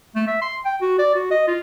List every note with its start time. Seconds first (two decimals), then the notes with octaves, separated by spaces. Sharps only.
0.15 A3
0.27 E5
0.42 C6
0.65 G5
0.81 F#4
0.99 D5
1.15 F#4
1.31 D#5
1.48 F4